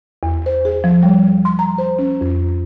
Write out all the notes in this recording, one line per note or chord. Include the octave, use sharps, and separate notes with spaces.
E2
C5
G#4
F3
G3
C6
A#5
C5
C#4
F2